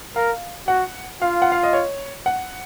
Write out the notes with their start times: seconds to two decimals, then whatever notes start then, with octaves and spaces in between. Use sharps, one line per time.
0.16 A#4 F5
0.68 F#4 F#5
1.21 F4 F5
1.42 F#5
1.52 F5
1.63 D#5
1.73 C#5
2.26 F#5